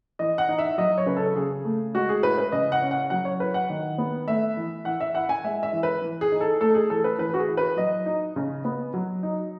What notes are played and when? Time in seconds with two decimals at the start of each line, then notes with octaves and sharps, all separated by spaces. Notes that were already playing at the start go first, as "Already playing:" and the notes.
0.19 E3 D#5
0.38 F#5
0.49 D#4
0.59 E5
0.78 F#3 D#5
0.98 C#5
1.06 C#3 B4
1.17 A4
1.36 C#3 G#4
1.65 A3
1.94 G#3 F#4
2.09 G#4
2.23 E4 B4
2.38 B4
2.52 C#3 D#5
2.72 F#5
2.82 C#4
2.91 F#5
3.10 F#3 F#5
3.25 C#5
3.40 E4 B4
3.54 F#5
3.70 D#3
3.98 B3
4.27 A3 E5
4.57 E3
4.85 E3 F#5
5.01 E5
5.15 E4 F#5
5.29 G#5
5.44 G#3 E5
5.63 E5
5.73 E3
5.83 B4
6.02 E3
6.21 G#4
6.32 D#4
6.41 A4
6.61 A3 A4
6.75 G#4
6.90 E3 A4
7.04 B4
7.18 E3 B4
7.34 F#4
7.39 G#4
7.48 E4
7.57 B4
7.77 F#3 D#5
8.06 D#4
8.36 C#3
8.65 B3
8.94 F#3
9.23 D#4